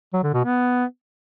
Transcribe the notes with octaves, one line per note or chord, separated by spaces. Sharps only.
F#3
D3
B2
B3